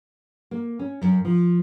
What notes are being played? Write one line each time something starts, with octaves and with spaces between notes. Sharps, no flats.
A#3
C#4
F#2
F3